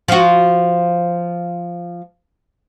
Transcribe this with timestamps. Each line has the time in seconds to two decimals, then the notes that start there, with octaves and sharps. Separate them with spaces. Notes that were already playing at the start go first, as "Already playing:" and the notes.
0.08 F3 F#4